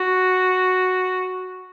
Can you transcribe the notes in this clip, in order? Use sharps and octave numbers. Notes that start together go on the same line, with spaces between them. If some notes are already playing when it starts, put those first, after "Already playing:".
Already playing: F#4